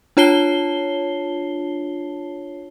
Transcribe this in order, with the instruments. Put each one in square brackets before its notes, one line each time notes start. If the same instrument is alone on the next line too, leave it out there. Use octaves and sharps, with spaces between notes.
[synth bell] D4 F4 C#5 A5 C7 G7